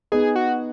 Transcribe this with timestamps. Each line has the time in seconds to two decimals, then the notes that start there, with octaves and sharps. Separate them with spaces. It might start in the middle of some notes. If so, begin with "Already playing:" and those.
0.12 B3 D#4 G#4
0.36 F#4